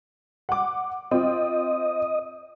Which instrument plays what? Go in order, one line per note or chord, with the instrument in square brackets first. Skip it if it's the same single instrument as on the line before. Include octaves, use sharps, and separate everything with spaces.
[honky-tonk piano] F#5 D6
[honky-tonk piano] C4 F4 [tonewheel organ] D#5